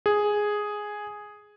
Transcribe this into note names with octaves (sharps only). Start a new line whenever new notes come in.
G#4